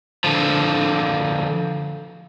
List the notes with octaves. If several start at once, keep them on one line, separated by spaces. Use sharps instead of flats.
D3 F3